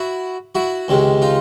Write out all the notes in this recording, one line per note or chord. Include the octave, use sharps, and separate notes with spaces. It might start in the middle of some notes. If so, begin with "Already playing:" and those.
Already playing: E4 F#4
E4 F#4
C#2 C3 D#3 G#3
D#4 F4